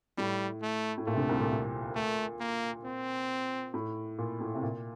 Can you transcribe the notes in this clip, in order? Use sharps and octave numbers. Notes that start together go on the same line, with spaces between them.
A2 G3
A3
A2
A#2 A3
C3
D2 D3
C2 C3
A#2
A#2
A3
A#3
C4
A2
A#2
A2
C3
A#2